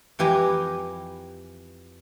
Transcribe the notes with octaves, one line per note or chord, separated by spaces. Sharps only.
F2 E3 G4 B4 G#5 A#5